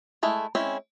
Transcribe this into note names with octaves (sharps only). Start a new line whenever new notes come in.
G#3 A3 E4
G#3 C4 C#4 E4